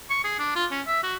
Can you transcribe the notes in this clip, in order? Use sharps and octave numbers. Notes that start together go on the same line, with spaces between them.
C#6
G#4
D4
F4
C#4
E5
F#4